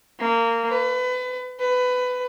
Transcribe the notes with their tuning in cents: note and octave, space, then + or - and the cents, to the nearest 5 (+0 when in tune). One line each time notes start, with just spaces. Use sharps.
A#3 -20
B4 +30
B4 +20